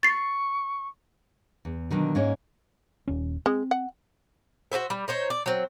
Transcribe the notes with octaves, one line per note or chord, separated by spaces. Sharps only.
C#6 A6 C7
E2
B2 D3 D#3 F#3
G#2 A#3 C#4 D#4 C#5
D#1 C#4
G#3 C4
F#5
F#4 A4 C5 E5
G3
D#4 C5 C#5
D5
F#3 C4